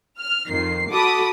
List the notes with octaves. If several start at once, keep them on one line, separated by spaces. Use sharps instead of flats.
F6
F2 D#3 C7
F#4 A4 A5 B5 D6 D#6